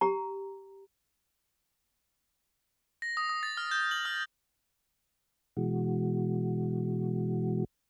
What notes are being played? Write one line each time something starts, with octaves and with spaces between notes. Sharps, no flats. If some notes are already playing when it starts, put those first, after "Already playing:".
G4 A#5
A#6
D#6
D#6
A6
F6
G6
F#7
F6
B2 E3 G#3 F#4